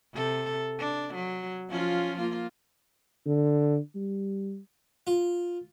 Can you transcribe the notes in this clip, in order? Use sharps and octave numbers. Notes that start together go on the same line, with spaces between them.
C3 A4
D4
F#3
F3 C#4 F4
A#3 F4
D3
G3
F4